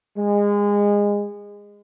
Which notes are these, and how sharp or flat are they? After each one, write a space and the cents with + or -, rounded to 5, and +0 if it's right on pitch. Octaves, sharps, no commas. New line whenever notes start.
G#3 -25